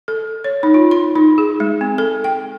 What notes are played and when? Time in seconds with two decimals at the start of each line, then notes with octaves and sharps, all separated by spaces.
0.08 A4
0.44 C#5
0.63 D#4
0.74 F4
0.91 C6
1.16 D#4
1.38 G#4
1.60 G#3
1.81 C4
1.98 A4
2.24 G5